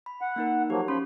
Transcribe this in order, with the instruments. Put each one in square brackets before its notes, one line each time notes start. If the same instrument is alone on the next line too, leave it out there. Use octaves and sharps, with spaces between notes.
[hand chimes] B5
[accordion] F#5
[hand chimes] A#3 D#4 A#4
[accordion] F3 F#3 A#3 [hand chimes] G4
[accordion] F3 B5 C6 [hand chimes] C#4